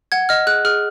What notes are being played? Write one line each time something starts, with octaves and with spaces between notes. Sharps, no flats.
F#5 G#6
D#5 F6
G#4 F#6
G#4 F6